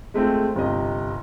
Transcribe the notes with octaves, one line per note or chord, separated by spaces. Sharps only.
G#3 A3 C4 F4
G1 C3 D#5